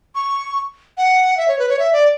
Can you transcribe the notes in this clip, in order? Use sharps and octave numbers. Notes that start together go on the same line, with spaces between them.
C#6
F#5
E5
C#5
B4
C#5
E5
D5